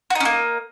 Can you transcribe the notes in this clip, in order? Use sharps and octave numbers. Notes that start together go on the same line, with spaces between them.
A#3 C#4 D#4 F#4